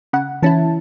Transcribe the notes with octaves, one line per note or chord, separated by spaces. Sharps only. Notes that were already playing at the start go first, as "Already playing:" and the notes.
C#3 F#5
E3 C#4 E4 A5